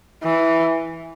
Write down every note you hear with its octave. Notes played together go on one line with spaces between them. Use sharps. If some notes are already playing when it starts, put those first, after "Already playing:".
E3